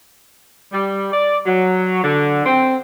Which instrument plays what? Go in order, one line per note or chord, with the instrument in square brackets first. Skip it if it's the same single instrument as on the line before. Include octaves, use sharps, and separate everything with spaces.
[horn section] G3
D5
F#3
D3
C4